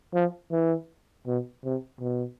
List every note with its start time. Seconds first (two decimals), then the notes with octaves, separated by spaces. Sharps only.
0.14 F3
0.51 E3
1.27 B2
1.64 C3
2.01 B2